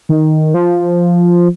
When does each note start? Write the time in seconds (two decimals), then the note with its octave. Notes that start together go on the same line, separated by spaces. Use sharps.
0.09 D#3
0.54 F3